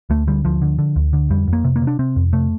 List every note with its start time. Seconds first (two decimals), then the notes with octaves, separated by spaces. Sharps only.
0.10 D2 A3
0.27 D3 G3
0.45 D2 F3
0.62 D3
0.79 D3
0.96 D2
1.13 D3
1.30 F2 G3
1.48 F2
1.53 A#3
1.64 C3
1.76 A#3
1.82 C3
1.87 D4
1.99 C3 C4
2.16 F2
2.33 C3 A3